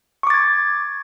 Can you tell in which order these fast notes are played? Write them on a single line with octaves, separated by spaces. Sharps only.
C#6 D6 A6 G#6